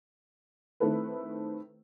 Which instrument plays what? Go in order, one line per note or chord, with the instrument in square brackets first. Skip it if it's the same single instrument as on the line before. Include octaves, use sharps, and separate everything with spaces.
[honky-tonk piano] D#3 A3 C4 E4 A4 B4